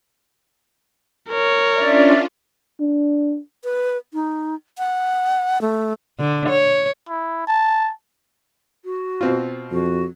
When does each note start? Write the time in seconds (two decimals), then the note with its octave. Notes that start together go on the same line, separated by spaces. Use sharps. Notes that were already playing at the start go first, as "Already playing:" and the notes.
1.29 A#4 C#5
1.76 C#4 D4 F4 D5 E5
2.80 D4
3.64 B4
4.14 D#4
4.78 F#5
5.62 A3
6.19 D3
6.49 C#5
7.09 E4
7.47 A5
8.85 F#4
9.21 B2 C4 F4
9.71 F2 F#4